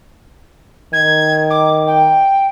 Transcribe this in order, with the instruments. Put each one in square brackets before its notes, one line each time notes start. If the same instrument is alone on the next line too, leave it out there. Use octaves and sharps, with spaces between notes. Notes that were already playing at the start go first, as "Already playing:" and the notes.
[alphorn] D#3 [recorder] G#6
[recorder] D6
G5